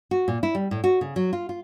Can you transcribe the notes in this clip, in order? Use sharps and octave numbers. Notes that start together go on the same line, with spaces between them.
F#4
A#2
E4
G3
A2
F#4
C#3
F#3
F4
F4